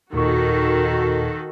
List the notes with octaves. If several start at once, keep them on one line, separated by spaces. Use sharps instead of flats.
D#2 A#2 D#3 F#4 A4 C#6